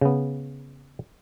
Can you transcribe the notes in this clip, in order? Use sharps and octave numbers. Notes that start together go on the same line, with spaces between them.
C#3 B3